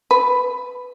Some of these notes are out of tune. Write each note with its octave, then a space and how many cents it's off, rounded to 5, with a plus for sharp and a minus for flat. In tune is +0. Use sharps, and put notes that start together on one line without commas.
B4 +5